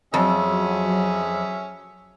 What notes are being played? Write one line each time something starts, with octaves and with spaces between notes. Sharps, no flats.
F2 F#3 C#4 G#4 E5